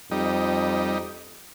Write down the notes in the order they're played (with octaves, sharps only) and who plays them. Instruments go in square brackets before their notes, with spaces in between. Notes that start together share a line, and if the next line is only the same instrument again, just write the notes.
[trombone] F2 [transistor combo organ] G3 D#4